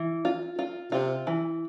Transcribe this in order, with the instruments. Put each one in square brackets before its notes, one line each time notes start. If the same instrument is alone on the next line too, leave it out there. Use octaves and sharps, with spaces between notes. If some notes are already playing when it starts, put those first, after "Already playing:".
Already playing: [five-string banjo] E3
F4
F4
[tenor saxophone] C3 [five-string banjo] F4
[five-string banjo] E3